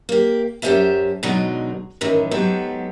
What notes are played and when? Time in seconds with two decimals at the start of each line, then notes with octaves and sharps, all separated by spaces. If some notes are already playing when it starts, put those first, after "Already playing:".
0.09 A#3 G4
0.62 F#2 C#4 G4 C5 E5 A5
1.23 B2 D3 F#3 G#3 D#4
2.01 F#2 A2 D#3 E3
2.31 G#2 F#3 B3 G4 A4